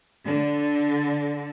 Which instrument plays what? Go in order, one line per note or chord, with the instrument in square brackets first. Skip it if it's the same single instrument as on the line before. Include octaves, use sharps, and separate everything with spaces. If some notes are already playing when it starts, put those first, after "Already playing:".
[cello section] D3